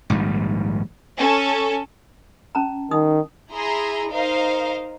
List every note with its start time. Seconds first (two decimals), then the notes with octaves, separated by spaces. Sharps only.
0.10 A#1 G#2 D#3 G3
1.18 C#4 A4
2.55 C#4 A5 A#5
2.91 D#3 D#4 D#6
3.52 E4 G#4 E5 A#5 C6
4.11 D#4 A#4 C5 D#5 F5